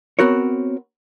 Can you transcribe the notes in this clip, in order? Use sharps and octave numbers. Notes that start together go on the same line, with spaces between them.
B3 C4 F#4 A#4 C#5